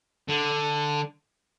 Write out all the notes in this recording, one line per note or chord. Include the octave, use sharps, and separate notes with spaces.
D3